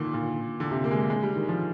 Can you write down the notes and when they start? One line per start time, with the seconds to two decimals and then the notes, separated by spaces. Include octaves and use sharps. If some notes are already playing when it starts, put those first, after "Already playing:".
Already playing: A#2 D3 D#3
0.14 A#2
0.60 D3
0.71 C3
0.84 A#3
0.91 G#3
0.96 A#3
1.10 G#3
1.23 G3
1.35 D#3
1.49 F3